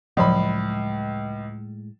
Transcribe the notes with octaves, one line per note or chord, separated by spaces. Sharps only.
C#2 A2 F3 F#3 G#3 B5